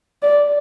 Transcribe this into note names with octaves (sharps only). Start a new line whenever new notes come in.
D5